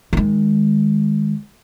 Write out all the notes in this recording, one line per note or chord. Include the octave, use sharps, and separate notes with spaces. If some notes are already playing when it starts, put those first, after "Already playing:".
D#3 G#3